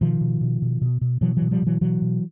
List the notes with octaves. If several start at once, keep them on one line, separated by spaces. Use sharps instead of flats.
B2 D#3 F3
B2
B2
B2
B2
B2
B2 E3 F#3
B2 E3 F#3
F3 G3
B2 E3 F#3
B2 E3 F#3
B2